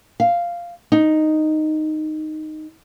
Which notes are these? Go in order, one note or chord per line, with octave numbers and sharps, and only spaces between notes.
F5
D#4